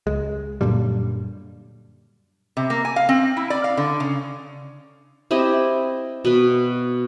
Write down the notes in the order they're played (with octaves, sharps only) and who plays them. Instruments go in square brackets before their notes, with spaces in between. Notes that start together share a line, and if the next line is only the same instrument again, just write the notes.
[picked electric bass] C#2 G#3
F#2 A#2 D3 G3
[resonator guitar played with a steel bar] C3
A#3
G#5
F5
C4
E4
D5
F5
D3
C#3
[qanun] C4 E4 G4 D#5
B2 B4